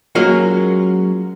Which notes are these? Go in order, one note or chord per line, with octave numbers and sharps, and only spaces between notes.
F#3 G#3 A#3 C#4 F4 F#4